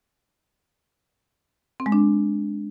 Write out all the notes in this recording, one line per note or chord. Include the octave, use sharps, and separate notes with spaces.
C4
G#3
D4